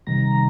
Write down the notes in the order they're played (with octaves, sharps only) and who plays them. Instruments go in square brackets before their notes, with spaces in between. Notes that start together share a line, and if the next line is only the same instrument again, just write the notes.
[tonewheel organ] C3 D#3 G3 A#5